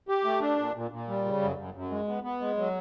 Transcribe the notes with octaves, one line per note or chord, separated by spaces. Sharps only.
G4
A3
D4
A#2
A#2
A#2
G3
C#3
F#2
F#2
F#2
G#3
B3
B3
G#3
F#3